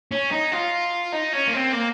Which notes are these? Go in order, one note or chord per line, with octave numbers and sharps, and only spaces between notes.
C#4
D#4
F4
D#4
C#4
A#3
C4
A#3